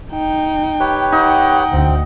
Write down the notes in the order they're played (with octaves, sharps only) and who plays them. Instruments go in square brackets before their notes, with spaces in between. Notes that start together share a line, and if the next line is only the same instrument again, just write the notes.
[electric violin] D#4 G5
[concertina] G4 B4 C#5
[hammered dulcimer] D#4 [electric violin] F#5 G5
[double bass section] D2 [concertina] C4